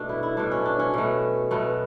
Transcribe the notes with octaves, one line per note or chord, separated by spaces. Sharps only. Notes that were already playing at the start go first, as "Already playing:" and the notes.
Already playing: B2 A3 D4
E4
E4
B2 A3 D4
C#4
D4
C#4
B2 A3
B2 A3 B3